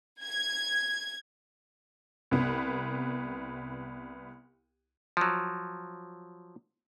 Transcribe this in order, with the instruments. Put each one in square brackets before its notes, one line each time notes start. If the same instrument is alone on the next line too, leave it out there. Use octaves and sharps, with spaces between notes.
[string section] G#6
[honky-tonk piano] C2 B3
[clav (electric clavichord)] F3 F#3